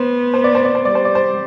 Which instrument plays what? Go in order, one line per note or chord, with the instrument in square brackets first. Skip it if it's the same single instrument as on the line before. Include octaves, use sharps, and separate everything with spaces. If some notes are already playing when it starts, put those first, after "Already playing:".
Already playing: [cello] B3 [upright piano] C5
[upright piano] C5
D5
C5
D5
C5
[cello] G3 [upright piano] D5
[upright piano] C5
D5
C5